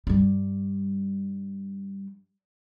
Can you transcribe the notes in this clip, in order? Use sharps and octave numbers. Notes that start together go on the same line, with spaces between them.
G2 G3